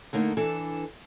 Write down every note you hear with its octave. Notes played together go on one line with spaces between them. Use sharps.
D3 A3 A#3 D#4
E3 D4 A4